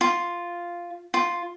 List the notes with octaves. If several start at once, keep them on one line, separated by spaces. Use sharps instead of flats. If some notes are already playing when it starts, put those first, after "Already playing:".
F4
F4